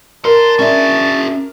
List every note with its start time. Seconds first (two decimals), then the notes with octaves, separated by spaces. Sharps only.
0.25 A#4 D5 A5 C6
0.59 C#4 D4 F#4 G#4 E5